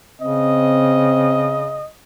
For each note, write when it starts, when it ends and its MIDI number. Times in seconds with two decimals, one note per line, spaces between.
0.22 1.84 49
0.22 1.66 60
0.22 1.88 75